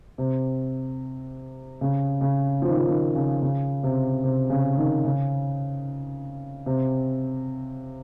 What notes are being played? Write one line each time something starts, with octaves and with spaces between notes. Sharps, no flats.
C3
C#3
C#3
F3
D#3
F3
D#3
C#3
C#3
C3
C3
C#3
D#3
C#3
C3